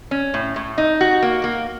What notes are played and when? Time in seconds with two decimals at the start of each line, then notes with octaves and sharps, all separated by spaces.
0.11 C#4
0.34 A2
0.56 A2
0.78 D#4
1.01 F#4
1.22 A#3
1.44 A#3